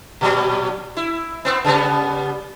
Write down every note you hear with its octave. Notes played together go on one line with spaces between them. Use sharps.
A#2 F#3 G3
E4
B3 C4
C#3 G3 B3